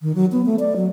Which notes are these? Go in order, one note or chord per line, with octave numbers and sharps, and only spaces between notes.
D#3
F#3
B3
A3
D5
F#3